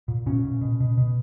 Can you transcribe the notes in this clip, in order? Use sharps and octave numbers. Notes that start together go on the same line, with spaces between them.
A#2
A#2 C#4
A#2
B2
B2
B2